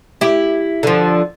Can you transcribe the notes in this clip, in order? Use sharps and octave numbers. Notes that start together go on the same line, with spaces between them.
E4 G4
D3 F3